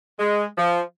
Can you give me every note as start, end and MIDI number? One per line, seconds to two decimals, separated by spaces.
0.20 0.45 56
0.58 0.81 53